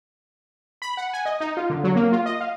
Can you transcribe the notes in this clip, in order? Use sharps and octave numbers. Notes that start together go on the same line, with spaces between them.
B5
F#5
G#5
D#5
D#4
F4
D3
F#3
A#3
F4
D#5
F5